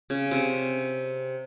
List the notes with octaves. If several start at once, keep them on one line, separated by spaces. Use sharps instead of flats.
C#3
C3